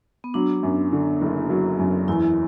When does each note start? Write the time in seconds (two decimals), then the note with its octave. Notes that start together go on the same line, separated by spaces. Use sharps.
0.24 B3
0.34 F#3 D4
0.63 F#2
0.92 D3
1.21 F#1
1.50 F#3
1.79 F#2
2.08 E2 E4